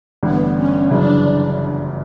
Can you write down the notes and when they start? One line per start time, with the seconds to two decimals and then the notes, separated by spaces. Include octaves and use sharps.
0.23 A1 G2 D3 B3
0.56 C#4
0.90 G1 F#2 C#3 E3 D4